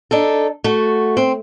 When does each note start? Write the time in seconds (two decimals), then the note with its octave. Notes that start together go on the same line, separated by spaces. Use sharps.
0.11 D4 D#4 A4
0.64 A3 F#4
1.17 C4